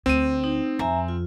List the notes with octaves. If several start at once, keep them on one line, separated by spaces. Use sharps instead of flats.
D2 C4 D#7
D#4
F2 E5 G#5 A#5
F4